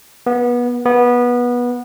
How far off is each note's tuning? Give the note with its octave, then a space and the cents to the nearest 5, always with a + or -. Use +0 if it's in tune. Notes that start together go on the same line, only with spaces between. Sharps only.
B3 -25
B3 -20